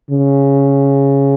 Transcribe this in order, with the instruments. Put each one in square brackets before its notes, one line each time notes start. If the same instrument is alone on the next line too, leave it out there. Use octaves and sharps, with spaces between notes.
[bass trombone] C#3